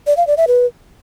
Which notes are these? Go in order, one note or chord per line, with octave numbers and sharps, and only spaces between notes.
D5
F5
D5
E5
B4